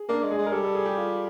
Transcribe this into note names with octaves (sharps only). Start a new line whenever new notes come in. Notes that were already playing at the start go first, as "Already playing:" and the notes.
Already playing: G#4
A#3 D4
G#3
G#4
G#3
A#4
G3 A4
A4
G#4
G4
F4